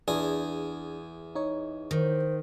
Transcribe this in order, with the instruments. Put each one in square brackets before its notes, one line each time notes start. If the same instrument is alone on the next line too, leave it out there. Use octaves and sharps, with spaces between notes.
[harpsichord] E2 G#4 [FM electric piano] D4
[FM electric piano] D#4 C#5
[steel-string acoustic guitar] D#3 [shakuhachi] C5